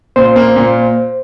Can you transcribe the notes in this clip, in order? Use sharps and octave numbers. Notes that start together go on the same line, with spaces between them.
A#2 C5
A#3
A#2